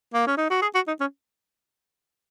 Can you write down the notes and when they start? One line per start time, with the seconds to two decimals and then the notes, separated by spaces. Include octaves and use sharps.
0.14 A#3
0.27 C#4
0.37 D#4
0.50 F#4
0.62 G#4
0.75 F#4
0.88 D#4
1.00 C#4